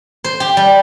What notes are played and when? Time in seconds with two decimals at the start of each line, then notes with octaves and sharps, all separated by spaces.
0.24 C5
0.40 G4
0.57 G3